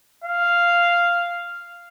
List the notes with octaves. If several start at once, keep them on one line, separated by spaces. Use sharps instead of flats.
F5